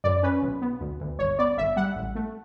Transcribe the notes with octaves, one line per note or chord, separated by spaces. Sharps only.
F#2 D5
C#4 B4
B1
B3
D2
D2
G1 C#5
B3 D5
G1 E5
G3 F#5
A1
A3